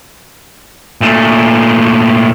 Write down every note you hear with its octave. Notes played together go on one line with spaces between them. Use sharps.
A#2 A3